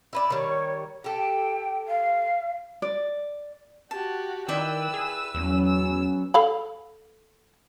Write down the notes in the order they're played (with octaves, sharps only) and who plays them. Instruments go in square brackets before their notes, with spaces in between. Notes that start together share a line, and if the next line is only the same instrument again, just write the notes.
[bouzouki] E4 B4 D5
[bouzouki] D#3 G3 [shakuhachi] C#5
[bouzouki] G4 A4 [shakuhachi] G5
[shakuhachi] F5
[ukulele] D5
[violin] F#4 G4 [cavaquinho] A5
[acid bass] D#3 [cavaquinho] E4 D5 G5 [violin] B4 E6
[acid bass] G#4
[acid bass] E2 [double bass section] F#3 B3 C#4
[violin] E6
[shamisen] A4 F5 B5